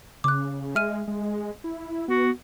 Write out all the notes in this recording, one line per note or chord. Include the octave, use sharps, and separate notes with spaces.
C#3 D6 F#6
G#3 E5 F6 D#7
G#3
E4
B3 F#4